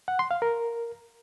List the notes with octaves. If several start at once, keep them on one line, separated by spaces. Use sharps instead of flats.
F#5
C6
F5
A#4